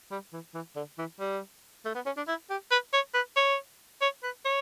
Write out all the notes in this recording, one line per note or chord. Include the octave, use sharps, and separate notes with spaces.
G3
E3
E3
D3
E3
G3
A3
B3
C#4
D4
E4
G4
B4
C#5
B4
C#5
C#5
B4
C#5